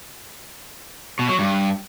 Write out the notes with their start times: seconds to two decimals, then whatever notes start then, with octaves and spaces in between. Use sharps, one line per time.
1.19 B2
1.29 F#3
1.39 G2